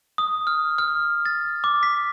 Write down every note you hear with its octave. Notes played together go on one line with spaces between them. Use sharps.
D#6
F6
F6
A6
D6
B6